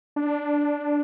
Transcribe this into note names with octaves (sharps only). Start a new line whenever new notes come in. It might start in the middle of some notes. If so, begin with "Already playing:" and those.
D4